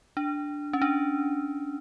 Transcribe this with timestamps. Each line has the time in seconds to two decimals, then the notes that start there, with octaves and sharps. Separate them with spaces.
0.17 D4
0.73 C#4
0.82 D4